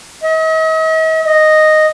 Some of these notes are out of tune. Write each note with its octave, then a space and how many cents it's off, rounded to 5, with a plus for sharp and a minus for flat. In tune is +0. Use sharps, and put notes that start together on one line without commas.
D#5 +45
D#5 -5